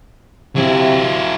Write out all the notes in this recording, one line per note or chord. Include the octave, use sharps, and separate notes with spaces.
C3 F#3 E4